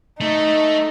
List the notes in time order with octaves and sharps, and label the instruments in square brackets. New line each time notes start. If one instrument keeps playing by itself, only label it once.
[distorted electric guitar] A3 [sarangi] D#4